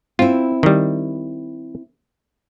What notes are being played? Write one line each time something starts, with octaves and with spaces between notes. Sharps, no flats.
C4 E4 F4
D#3 G3